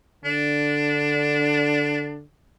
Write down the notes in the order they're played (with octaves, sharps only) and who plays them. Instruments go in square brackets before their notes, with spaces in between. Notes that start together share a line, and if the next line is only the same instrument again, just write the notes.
[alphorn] D3 [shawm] D4